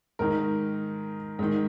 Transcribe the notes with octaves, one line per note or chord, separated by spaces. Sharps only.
G#2 D#3 A#4
G#2 D#3